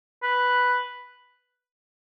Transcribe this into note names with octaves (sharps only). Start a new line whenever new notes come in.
B4